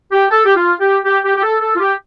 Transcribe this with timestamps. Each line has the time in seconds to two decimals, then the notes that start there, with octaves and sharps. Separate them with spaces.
0.12 G4
0.31 A4
0.45 G4
0.56 F4
0.81 G4
1.05 G4
1.24 G4
1.36 G4
1.43 A4
1.61 A4
1.76 F4
1.80 G4